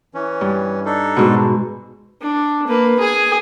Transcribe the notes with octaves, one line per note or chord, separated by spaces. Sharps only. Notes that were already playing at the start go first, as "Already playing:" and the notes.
E3 C#4
G2
D4 D#4 A4
G#2 B2
D4
A#3 B4
G#4 G#5